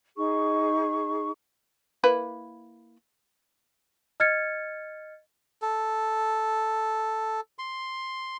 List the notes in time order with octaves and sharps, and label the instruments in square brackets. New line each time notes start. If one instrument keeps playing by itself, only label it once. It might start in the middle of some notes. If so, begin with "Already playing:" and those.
[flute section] D#4 G#4 C#6
[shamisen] A#3 E4 B4
[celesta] D#5 F6 G#6 A6 C#7
[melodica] A4
C6